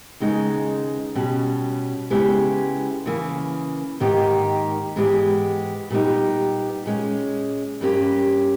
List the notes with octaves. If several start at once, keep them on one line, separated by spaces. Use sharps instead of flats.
D#2 C#3 G#3 B3 D#4
B2 G3 C#4
C#3 G#3 B3 E4 G4
C#3 E3 A#3
G#2 D#3 A#3 D#4 G4
G#2 E3 G#3 B3 G4
A#2 G3 B3 D#4 G4
A#2 G#3 C#4
G2 G3 A#3 C#4 G4